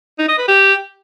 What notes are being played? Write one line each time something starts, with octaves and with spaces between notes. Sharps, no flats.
D#4
D#5
B4
G4